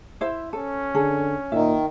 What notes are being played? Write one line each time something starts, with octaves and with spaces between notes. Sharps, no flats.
E4 C5 E5
C#4 A4
D3 G#4 A4
A#2 D#3 E5